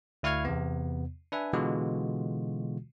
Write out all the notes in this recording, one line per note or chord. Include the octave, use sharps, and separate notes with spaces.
D2 E4 F5 C#6 F6 G#6
E2 C3 B3
D4 B4 E5 G#5
B2 D3 E3 G#3 F4 F#4